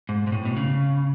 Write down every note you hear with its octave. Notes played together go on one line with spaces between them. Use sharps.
G#2
G#2
A2
B2
C#3